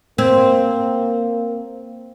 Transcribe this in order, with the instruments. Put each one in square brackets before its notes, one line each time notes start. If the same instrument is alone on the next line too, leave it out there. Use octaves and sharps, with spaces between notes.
[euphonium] A#3 [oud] C4